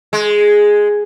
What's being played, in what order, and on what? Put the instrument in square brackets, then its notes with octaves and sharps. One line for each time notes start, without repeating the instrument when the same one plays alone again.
[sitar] G#3